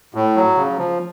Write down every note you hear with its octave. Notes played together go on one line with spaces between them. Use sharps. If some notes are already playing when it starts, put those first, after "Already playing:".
A2
F#3
C#3
F3